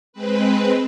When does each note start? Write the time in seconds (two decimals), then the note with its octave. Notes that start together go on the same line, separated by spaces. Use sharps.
0.13 G#3 C4 B4